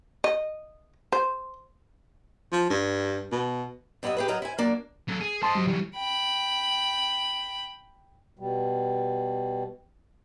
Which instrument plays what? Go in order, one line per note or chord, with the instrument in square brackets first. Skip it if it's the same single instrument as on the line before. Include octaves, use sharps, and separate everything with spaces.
[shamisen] D#5
C5
[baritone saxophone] F3
G2
B2
[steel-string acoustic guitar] G2 F#3 B3 F4 D#5 E5
G4 G#4 B4
G2 F#3 A#4 D#5 A#5
E4 C5 G#5
F#3 A#3 D4
[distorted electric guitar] F#3 A4
G#4
[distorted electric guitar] C5 D#5 [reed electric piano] A5 C6
[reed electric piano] F#3 G3
[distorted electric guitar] E3 F#3 [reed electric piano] G3
[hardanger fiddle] G5 B5
[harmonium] B2 G3